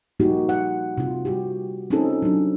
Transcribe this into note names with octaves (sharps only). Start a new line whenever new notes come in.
F3 G3 A#3 D#4 F#4 G4
F#5
C3 F4
G3 F#4 G4
C4 C#4 D#4 F4 G#4 A4
F#3 D4